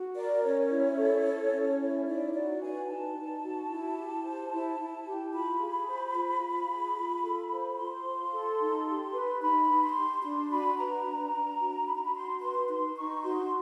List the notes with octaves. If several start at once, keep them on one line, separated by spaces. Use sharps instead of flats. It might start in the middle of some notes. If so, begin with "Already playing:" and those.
Already playing: F#4
A#4 D5
C#4 C#5
E4
A4
C#4
C#4
E4
D#4 D5
F#4 D5
B4 G#5
D#4 A5
D#4
F#4
E4
G4
C5
E4
E4
G4
F4 B5
G#4
C5
F4
F4
G#4
F4
A4
C5
F4 C6
F4
A4
D#4
G4
B4
D#4 B5
D#4
C6
G4
D4 C6
F#4 B5
B4 A#5
D4
D4
F#4
D#4 B5
A#5
B5
F#4 C6
B4 C6
D#4 C6
D#4 C#6
F#4 C6